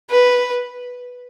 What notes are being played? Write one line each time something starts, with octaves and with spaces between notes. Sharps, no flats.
B4